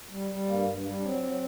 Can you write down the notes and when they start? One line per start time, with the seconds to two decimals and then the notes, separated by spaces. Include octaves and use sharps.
0.11 G3
0.30 G3
0.49 G2 A#3
0.67 G2
0.85 G3
0.95 D4
1.04 F#3 C4
1.22 F#3